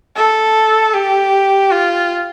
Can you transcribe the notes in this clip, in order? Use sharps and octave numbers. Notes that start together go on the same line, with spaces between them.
A4
G4
F4